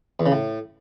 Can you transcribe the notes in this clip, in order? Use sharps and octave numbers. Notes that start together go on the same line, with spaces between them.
E2
C#3
A2